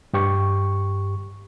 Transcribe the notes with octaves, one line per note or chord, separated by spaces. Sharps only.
G2 G4 C#6